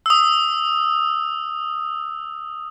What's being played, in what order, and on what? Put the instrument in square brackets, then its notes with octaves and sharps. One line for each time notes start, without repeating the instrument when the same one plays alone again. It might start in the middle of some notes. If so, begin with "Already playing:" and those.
[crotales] D#6 E6